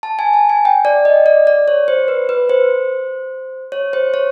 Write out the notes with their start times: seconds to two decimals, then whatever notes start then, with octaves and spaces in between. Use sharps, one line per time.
0.03 A5
0.19 G#5
0.34 A5
0.49 G#5
0.65 G5
0.85 D5
1.05 D#5
1.26 D5
1.47 D5
1.68 C#5
1.88 C5
2.08 B4
2.29 B4
2.49 C5
3.72 C#5
3.93 C5
4.14 C#5